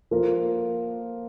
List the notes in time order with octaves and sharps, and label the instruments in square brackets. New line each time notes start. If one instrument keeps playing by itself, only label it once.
[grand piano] F3 A#3 F4 A#4